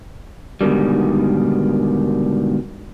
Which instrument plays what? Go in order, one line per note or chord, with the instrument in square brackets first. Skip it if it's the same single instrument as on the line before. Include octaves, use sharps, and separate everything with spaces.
[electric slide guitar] G#2 B2 D3 D#3 G3